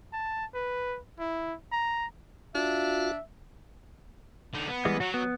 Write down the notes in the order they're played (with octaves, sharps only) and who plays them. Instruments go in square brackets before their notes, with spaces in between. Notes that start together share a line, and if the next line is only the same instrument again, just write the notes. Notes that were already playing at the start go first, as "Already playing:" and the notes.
[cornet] A5
B4
E4
A#5
[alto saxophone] D4 [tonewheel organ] F4 F#4 F5 [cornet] E5
[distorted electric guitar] D3 D#4
B3
[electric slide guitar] E3 G3 G#3
[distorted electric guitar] F#3 [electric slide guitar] F#4
[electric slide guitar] B3